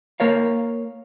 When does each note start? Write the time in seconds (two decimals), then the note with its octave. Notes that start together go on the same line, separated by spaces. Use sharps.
0.20 A#3 A#4 C#5 F5